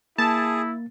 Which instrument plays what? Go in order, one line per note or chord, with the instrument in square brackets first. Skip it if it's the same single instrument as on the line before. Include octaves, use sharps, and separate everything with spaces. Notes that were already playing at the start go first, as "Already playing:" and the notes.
[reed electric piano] A#3 A6 [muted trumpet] E4 [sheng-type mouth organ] G#4 [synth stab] A5